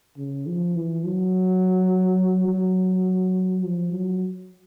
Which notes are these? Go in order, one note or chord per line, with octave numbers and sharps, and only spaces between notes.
C#3
F3
E3
F#3
F#3
F3
F#3